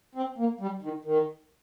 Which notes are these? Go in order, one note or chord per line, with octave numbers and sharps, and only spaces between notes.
C4
A#3
G3
D#3
D#3